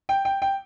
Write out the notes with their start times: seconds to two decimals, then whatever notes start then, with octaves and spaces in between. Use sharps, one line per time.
0.09 G5
0.25 G5
0.42 G5